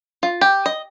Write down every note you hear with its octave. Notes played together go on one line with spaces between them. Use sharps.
F4
G4
D#5